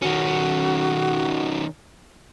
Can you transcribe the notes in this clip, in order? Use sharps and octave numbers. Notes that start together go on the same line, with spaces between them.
D#3 C#4 F#4